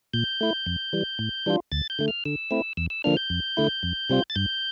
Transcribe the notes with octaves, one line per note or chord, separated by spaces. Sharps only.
A#2 G6
A3 E4
F2
E3 G3
A2
E3 G3 D4 F4
D2 A6
G6
D3 A3
F6
D3 E6
A3 C4 E4
E2 E6
E6
D3 F3 A#3 D4 F6
G6
F2
D3 A3 E4
F2
C3 G3 C4 F4
A6
G2 G6